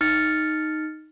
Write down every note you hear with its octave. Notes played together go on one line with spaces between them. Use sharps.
D#4 F6 A6 C#7